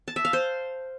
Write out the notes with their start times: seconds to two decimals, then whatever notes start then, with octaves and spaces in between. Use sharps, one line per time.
0.08 A5
0.16 E5
0.25 F5
0.33 C5